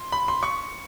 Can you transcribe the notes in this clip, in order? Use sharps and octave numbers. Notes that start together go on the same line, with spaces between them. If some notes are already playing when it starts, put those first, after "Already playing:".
Already playing: C6
B5
C6
C#6